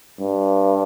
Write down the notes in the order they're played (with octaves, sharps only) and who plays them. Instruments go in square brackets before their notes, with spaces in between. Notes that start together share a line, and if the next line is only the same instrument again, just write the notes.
[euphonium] G2